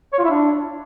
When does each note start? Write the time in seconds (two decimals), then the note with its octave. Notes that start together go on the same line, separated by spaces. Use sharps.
0.13 C#5
0.18 F4
0.24 E4
0.30 D4